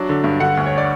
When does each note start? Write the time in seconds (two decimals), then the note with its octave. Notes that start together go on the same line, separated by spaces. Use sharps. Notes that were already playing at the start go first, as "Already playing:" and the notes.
Already playing: F#3 D4 E5
0.09 D3
0.24 G2
0.40 D3 F#5
0.57 D2
0.66 C#5
0.78 D5